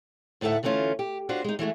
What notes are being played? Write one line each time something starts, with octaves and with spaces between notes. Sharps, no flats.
D2 A2 D#4 A4 E5 F#5
D3 E3 A3 C#4 F4
G4
D4 F4 F#4 C5
G#3 D#4
E3 G#3 A3 F#4